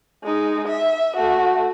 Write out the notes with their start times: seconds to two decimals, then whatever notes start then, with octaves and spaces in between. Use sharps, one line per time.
0.23 G#3 D#4
0.67 E5
1.16 A3 F#4